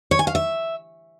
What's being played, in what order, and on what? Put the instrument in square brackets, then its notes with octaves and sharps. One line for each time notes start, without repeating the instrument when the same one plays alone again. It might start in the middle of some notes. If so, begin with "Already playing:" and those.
[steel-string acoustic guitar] C#5
G#5
F5
E5